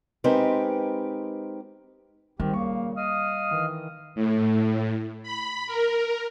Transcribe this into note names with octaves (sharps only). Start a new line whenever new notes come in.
G#3 C4 D#4 G4 A#4 B4
G#2 D#3 G3 C4 G4
A#2 C#3 A#3 C#6
D#5 F5 D#6 F6
D#3 E3
A2
B5
A#4